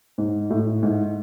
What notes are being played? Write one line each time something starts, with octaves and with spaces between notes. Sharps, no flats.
G#2
A2
G#2